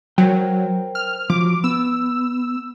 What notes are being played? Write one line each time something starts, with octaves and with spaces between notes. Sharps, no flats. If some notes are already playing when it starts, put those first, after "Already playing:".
F#3 A#4 C5 G5
F6
F3 F#3 D6
B3 E6